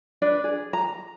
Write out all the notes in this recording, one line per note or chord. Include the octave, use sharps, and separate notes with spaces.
D4 B4 D5
G#4
A#5